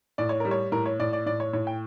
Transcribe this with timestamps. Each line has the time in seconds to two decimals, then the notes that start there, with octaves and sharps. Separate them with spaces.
0.18 A2 D5
0.29 C#5
0.40 G3 A#4
0.51 C#5
0.72 A2 A#4
0.86 C#5
1.00 A2 D5
1.13 D5
1.26 A2 D5
1.40 C#5
1.53 A2 C#5
1.67 G5